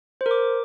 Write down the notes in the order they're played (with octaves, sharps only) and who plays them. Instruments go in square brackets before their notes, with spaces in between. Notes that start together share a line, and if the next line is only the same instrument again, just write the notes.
[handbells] C5
A#4
D6